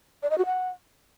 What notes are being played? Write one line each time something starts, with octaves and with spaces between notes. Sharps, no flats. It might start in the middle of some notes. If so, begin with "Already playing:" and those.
D5
D#5
F#4
F#5